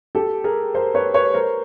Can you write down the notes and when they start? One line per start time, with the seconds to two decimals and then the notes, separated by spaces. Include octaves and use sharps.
0.15 G4 A4
0.44 G#4 A#4
0.75 A#4 C5
0.94 B4 C#5
1.14 B4 C#5
1.34 A#4 C5